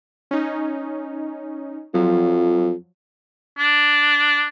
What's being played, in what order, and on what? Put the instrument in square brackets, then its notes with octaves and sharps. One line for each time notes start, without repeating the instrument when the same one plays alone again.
[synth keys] C#4 D#4
[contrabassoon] F2 [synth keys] F3 F#3
[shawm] D4